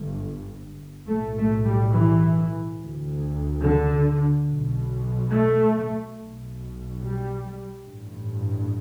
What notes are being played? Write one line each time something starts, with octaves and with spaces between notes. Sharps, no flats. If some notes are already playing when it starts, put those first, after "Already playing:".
Already playing: G1 G2
B1 A2 A3
A3
G3
E3
D2
D3
B1 B2
A3
B1 B2
G3
A1 G2